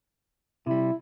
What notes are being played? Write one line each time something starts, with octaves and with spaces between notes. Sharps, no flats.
C3 G3 E4